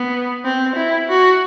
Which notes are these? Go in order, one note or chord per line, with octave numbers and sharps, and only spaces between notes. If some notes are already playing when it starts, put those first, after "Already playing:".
Already playing: B3
C4
E4
F#4